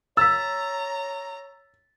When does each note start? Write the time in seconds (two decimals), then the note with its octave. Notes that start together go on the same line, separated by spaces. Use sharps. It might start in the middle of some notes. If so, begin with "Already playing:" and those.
0.17 C#5 A#5 E6 A6 B6